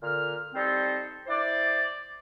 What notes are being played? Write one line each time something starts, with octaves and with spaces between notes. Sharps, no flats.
A#2 D3 F6
G3 C4 D#4 A4 C5
E4 C5 D5